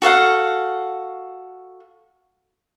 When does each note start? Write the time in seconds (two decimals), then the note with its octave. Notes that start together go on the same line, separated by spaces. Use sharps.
0.02 F#4 A4 F5 F#5